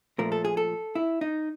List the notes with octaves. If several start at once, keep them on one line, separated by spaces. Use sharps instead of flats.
A#2 F3 A3 A#4
A4
G#4
A4
E4
D#4